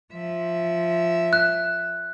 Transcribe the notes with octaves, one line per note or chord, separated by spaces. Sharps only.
F3 E5
F#6